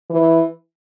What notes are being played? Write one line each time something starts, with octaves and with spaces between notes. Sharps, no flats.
E3